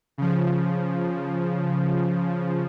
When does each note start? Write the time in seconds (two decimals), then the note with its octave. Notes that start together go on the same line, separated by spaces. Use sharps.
0.18 C#3 F3